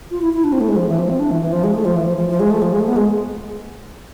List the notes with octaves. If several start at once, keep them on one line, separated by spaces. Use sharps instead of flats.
F4
E4
E4
D4
C4
A3
G#3
F3
E3
F3
C4
D4
E3
E3
F3
G#3
A3
F3
E3
F3
F3
F3
G#3
A3
F3
G#3
A3
B3
G#3